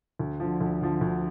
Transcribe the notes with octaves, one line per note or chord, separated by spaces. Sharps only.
D2
D3 F3
D2
D3 F3
D2